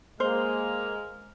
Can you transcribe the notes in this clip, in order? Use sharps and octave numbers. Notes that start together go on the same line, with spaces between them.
G#3 A#3 C5 F6